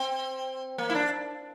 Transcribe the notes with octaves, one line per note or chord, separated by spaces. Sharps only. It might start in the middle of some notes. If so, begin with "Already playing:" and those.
Already playing: C4
A#3
E4
D4